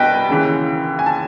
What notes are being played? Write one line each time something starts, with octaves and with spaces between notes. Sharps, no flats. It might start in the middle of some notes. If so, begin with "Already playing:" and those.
Already playing: C2 B2 B4 D#5 G5
D#2 C#3 E3
G#5
A5